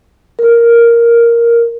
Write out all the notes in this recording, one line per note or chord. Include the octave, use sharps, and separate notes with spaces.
A#4